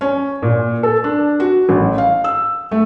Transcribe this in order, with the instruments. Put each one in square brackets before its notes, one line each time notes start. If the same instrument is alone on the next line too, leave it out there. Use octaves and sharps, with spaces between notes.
[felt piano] C#4
A#2
A4
D4
F#4
A1
F5
E6
A3